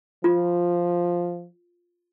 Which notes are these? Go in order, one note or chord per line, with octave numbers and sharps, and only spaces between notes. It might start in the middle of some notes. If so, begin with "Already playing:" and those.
F3 F4